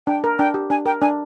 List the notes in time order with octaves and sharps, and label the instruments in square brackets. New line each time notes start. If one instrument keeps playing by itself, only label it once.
[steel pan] D4 [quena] G5
[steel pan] A#4
[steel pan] D4 [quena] G5
[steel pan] G4
[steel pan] D4 [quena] G#5
[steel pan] A#4 [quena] G5
[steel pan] D4 [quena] G#5